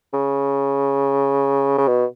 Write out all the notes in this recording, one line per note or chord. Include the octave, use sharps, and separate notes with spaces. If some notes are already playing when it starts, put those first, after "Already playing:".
C#3
C#3
B2